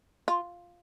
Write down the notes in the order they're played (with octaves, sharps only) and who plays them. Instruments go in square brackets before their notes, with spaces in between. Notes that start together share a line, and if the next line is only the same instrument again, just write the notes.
[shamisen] F4